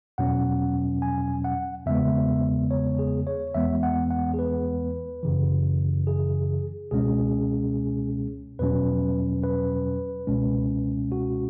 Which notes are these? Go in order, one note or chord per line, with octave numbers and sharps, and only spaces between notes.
E2 B2 F#3 C#4 F#5
G#5
F#5
E2 C#3 G#3 B3 E5
C#5
G#4
C#5
E2 E3 G#3 B3 E5
F#5
F#5
G#4
B4
F#2 C#3 E3
G#4
C#2 B2 G#3 C#4 G#4
E2 B2 F#3 C#4 B4
B4
C#2 B2 G#3 C#4
F#4